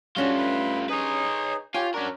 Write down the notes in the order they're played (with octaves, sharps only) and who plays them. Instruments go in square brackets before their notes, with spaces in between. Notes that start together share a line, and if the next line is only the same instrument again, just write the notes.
[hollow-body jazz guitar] G3 C#4 D4 [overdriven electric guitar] A3 F4 [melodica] F#4
[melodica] B4
[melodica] D#4 G#4 [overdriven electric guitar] B4 C#5
[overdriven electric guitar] F4 [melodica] G4 C#5 [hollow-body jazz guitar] G5 G#5
[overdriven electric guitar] C#4 A#4 [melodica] D4 F#4